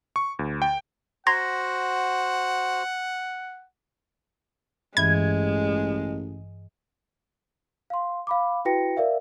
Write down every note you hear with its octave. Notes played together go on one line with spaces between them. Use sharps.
C#6
D2
G5
F#4 C5 F#5 A#5 C6 G#6 A#6
A1 G2 E3 G#3 G#6
F5 C6
F5 B5 D6
E4 F#4 B4 G5 A#6 C#7
A#4 D5 E5 F5